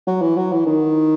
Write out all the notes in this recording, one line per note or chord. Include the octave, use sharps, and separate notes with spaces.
F#3
E3
F#3
E3
D#3